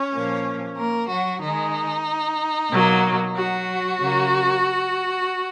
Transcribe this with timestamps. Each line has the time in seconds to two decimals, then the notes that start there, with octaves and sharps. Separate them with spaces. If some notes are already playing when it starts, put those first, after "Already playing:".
Already playing: C#4 C#5
0.12 A#2 F3 A#3
0.77 A#3 A#4
1.09 F#3 F#4
1.41 D#3 G#3 D#4
2.71 B2 F#3 A#3
3.35 F#3 F#4
4.00 C#3 F#3 A#3